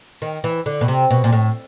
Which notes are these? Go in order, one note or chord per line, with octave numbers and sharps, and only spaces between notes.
D#3
E3
D3
B2
C3
B2
A#2
A2